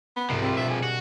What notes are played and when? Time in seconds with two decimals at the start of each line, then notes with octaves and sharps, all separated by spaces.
0.16 B3
0.30 C2 G#2 C3 F3
0.42 C4 G4 E5 B5
0.57 B2 D4 E5
0.70 G#4
0.83 F#4